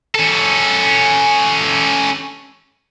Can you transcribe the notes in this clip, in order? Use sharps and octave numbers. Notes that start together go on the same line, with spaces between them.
C#4 A4